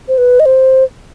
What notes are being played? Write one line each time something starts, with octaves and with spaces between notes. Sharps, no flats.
C5
B4
D#5
C5